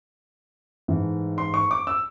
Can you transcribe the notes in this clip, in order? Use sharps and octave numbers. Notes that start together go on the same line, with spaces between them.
G#2 E3 A3
C6
C#6
D6
E6